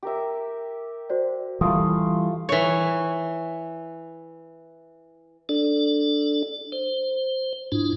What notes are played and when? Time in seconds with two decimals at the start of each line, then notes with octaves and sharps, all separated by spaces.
0.03 G4 A#4 E5
1.10 F#4 C5 D5
1.61 E3 G3 A3 F4 D#6
2.49 E3 C#5
5.49 D4 A4 D5
6.72 C5
7.72 G#2 D4 E4 F4